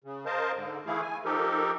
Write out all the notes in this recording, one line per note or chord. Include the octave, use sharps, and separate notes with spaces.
C#3
A#4 C5 D#5 F5 A5
G#2 D3
E3 A3 E4 G#4 F5
G#5
F3 D#4 G4 A4 A#4